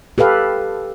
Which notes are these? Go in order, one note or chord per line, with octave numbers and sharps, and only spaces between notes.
G4 A4 B4 F5